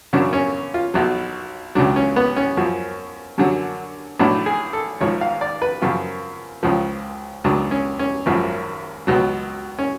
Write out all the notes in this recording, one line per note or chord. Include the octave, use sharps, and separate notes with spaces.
F#2 C#3 F#3 D4
C#4
F4
B1 B2 F#3
C#2 C#3 F#3 D4
C#4
B3
C#4
F#2 F3
F#2 D3 F#3
B1 A2 F#3 D4
G#4
A4
G#1 G#2 F3 C#5
F5
D5
B4
F#2 C#3 F3 F4
C#2 C#3 F3
C#2 C#3 F#3 D4
C#4
C#4
G#1 F#2 F3
C#2 B2 F#3
C#4